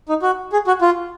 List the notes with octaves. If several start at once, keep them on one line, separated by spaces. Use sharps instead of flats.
D#4
F#4
G#4
F#4
F4